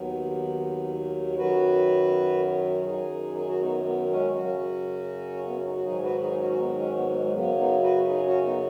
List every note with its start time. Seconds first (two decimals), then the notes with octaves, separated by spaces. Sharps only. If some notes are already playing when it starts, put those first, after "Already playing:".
Already playing: D#2 D#3 F#3 B3
1.37 F#2 D#3 F#3 F#4 B4
2.86 F#2 D#3 F#3 D#4 G#4
3.35 G#4
3.48 F#4
3.60 B3 D#4
3.85 B3
4.11 G#3 C#4
4.35 F#2 C#3 F#3 C#4 F#4
5.47 B3
5.56 C#4
5.65 D#4
5.75 F#4
5.84 G#2 D#3 F#3 D#4 G#4
6.03 F#4 B4
6.21 D#4 G#4
6.33 D#4
6.40 C#4 F#4
6.52 F#4
6.58 B3 D#4
6.77 G#3 C#4
6.96 B3
7.09 B3
7.14 G#3
7.25 G#3
7.33 F#2 C#3 F#3 B3
7.58 B3 D#4
7.82 F#4 B4
8.08 D#4 G#4
8.26 C#4 F#4
8.44 B3 D#4